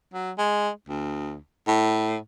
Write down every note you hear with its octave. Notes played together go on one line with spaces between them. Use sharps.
F#3
G#3
D2
A2